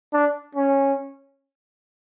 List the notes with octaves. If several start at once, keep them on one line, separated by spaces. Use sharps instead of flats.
D4
C#4